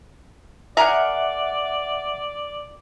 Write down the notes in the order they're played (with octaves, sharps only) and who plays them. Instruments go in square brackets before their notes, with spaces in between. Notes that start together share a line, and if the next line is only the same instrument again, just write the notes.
[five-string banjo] G#4 A#4 A#5 [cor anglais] D5 [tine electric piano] E5 F#5